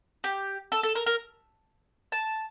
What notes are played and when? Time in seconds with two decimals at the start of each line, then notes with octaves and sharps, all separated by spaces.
0.24 G4
0.72 A4
0.83 A4
0.95 A#4
1.06 A#4
2.12 A5